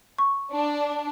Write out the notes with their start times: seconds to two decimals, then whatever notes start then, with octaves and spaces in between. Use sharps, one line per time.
0.18 C#6
0.53 D4